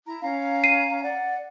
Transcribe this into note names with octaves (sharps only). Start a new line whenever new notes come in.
E4 A#5
C#4 F5 A#5
C7 D#7
D5 F#5